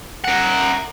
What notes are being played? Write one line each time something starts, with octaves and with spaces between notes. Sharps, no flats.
A#4 F#5